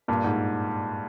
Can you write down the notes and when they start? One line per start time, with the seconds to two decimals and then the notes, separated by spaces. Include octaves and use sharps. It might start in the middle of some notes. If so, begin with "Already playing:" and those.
0.08 G2 A#2
0.24 G#2